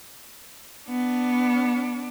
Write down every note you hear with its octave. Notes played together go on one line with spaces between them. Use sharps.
B3 D4